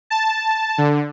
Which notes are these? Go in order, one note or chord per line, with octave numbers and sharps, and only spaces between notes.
A5
D3